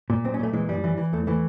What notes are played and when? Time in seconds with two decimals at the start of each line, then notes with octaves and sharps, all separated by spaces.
0.10 A#2
0.24 B1 C4
0.34 C#4
0.39 A#2 A3
0.53 E3 G#3
0.69 F#2 G3
0.84 E3
0.98 E3
1.13 E2 A3
1.27 E3 A3